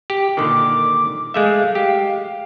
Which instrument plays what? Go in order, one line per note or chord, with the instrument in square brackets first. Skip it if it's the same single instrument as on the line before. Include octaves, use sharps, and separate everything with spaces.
[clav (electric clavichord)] G4
[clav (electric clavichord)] A#2 D3 D#3 [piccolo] D6
[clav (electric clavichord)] G#3 A3 E5 [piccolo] F5
[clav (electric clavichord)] G4 [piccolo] F5